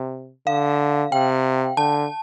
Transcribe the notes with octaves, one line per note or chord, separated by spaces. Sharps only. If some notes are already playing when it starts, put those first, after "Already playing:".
Already playing: C3
D3 F5
C3 G5
D3 A5